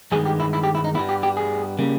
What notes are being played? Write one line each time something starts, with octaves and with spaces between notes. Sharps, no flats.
G2 D#3 G#3 B3 G#4
G4
E4
E4
G4
E4
D#4
G2 G3 B3 E4
G4
G4
G#4
C#3 G3 A#3